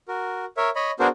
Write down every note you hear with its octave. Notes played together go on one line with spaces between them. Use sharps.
F#4 A#4
A#4 C#5 E5
C#5 D#5 B5
B3 D4 F#4 G#4 A#4 C5